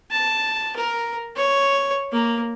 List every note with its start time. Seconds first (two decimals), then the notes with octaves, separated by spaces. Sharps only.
0.11 A5
0.77 A#4
1.37 C#5
2.12 A#3